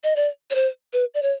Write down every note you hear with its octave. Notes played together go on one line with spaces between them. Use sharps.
D#5
D5
C#5
C5
B4
D5
C#5